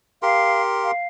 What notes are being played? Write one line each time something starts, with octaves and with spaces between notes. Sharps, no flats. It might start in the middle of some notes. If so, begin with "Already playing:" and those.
G4 A#4 F5 C6
F5